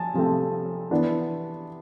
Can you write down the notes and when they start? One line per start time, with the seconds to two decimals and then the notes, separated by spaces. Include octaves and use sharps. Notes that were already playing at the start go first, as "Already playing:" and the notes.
Already playing: F3 G#5 A5
0.14 C3 F3 A3 C4
0.91 E3 B3 D4